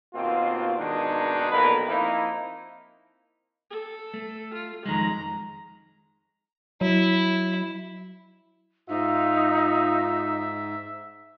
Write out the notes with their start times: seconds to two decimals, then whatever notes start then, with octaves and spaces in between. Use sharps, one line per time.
0.14 D#2 B2 A#3 C4 F4
0.78 G#1 B2 D#3 G#3 D4 D#4
1.51 B1 F2 A#2 A#4 B4
1.87 F3 A#3 C4 D#4 E4
3.70 A4
4.14 A3
4.55 F4
4.86 F2 D#3 G#3 A#5
6.81 F#3 E4
8.89 G#2 D#4 F4 E5